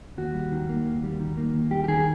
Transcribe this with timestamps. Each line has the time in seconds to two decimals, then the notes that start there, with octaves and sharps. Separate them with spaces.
0.18 D#2 F#4
0.34 G3
0.52 D#3
0.69 A#3
0.86 D#2
1.04 G3
1.20 D#3
1.37 A#3
1.54 D#2
1.71 G3 G4
1.84 G4
1.88 D#3 G#4